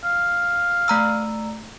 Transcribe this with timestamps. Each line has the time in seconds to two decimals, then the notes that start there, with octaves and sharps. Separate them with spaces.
0.04 F5
0.88 A3 A#5 E6